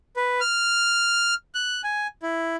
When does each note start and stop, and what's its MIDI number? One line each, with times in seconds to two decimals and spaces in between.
0.16 0.40 71
0.41 1.34 89
1.55 1.82 90
1.84 2.07 80
2.23 2.56 64